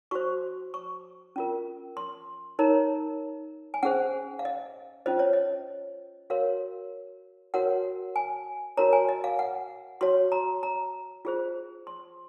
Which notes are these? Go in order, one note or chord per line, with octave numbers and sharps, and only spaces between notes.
F#4 C5 C#6
C#6
C#4 F4 A#4
C6
D#4 A#4 C#5 A#5
G#5
C#4 G#4 C5 F#5
F5
D#5
C#4 F4 C5 D#5
C#5
D#5
F#4 A#4 C#5 F5
F#4 A#4 C#5 F#5
G#5
F#4 A#4 C#5 A#5
G#5
D#5
F5
F#5
F#4 C#5 C6
A#5
A#5
F4 G#4 C5
C6